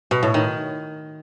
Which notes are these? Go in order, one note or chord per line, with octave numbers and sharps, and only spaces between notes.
B2
A2
D#3